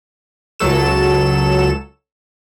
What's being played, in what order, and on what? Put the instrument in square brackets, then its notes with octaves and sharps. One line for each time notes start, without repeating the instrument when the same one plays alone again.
[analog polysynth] C#2 F#3 A4 E7